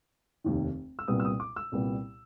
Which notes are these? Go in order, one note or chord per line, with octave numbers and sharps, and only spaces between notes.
F1 D#2 D#3
E6
C2 A#2 G3 B3 D#6
E6
D#6
D6
E6
C2 A#2 G3 B3